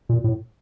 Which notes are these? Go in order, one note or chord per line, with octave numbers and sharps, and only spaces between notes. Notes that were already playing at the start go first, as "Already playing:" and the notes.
A#2
A2